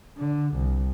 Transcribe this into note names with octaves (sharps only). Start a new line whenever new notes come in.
D3
C2